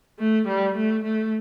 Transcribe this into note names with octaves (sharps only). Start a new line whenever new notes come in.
A3
G3
A3
A3